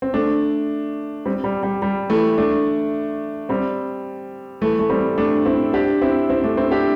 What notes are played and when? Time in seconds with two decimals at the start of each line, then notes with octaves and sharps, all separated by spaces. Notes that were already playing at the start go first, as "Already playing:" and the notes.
0.02 C4
0.14 A3 D4
1.26 G3 C4
1.44 G3
1.63 G3
1.82 G3
2.10 E3 A3
2.38 A3 D4
3.49 G3 C4
4.61 E3 A3
4.79 A3
4.89 G3 C4
5.18 A3 D4
5.46 C4 E4
5.74 D4 G4
6.01 C4 E4
6.30 C4 E4
6.44 A3 D4
6.57 C4 E4
6.71 D4 G4